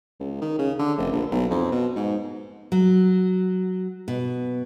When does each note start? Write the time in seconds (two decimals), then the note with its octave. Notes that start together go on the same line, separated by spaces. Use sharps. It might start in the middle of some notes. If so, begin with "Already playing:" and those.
0.20 C#2
0.41 D#3
0.59 C#3
0.79 D3
0.98 F1
1.12 A#1
1.32 B1
1.51 F2
1.72 B2
1.96 G#2
2.72 F#3
4.08 B2